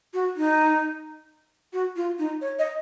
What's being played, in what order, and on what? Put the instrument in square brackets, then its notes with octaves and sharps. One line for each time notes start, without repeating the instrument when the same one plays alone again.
[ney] F#4
D#4
F#4
F4
D#4
C#5
D#5